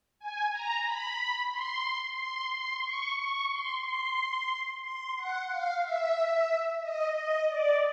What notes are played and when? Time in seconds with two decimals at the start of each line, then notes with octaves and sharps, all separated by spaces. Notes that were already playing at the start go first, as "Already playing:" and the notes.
0.20 G#5
0.52 A#5
0.85 B5
1.52 C6
2.18 C6
2.51 C6
2.84 C#6
3.17 C#6
3.51 C6
3.84 C6
4.83 C6
5.17 F#5
5.49 F5
5.83 E5
6.82 D#5
7.15 D#5
7.48 D5